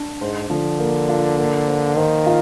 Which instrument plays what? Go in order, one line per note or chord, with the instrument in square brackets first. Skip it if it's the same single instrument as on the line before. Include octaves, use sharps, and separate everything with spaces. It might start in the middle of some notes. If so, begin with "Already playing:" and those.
Already playing: [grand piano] D4
[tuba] G#2 [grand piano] C5
[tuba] D3 [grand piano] F3
[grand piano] A#3
F4
A#3
C5
[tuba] D#3 [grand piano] C5
[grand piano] F4